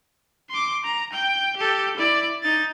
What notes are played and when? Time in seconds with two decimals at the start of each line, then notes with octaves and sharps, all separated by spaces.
0.50 C6 D6
0.84 A#5
1.13 G5
1.56 G4 A4
1.97 E4 D5
2.43 D#4 A6